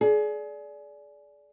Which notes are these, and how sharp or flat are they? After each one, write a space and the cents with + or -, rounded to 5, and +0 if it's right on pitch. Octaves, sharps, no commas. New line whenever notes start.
G#4 +30 D5 -10